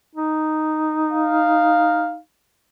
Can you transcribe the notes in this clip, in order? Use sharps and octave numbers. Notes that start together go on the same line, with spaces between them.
D#4
F5